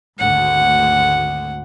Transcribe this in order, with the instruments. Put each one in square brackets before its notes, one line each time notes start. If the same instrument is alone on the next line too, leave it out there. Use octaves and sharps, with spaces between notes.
[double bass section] G#1 D2 [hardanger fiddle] F#5